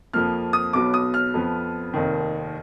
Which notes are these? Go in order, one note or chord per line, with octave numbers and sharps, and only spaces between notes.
F2 F3 A#3 F6
D#6
B1 B2 F#3 B3 D6
D#6
F6
F2 F3 B3
F1 D#2 D#3